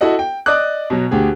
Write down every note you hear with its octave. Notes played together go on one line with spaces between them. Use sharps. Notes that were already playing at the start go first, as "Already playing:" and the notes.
E4 F#4 A4 D#5 F#5
G5
D5 D#5 D6 D#6 F#6
B2 F#3
D2 G4 G#4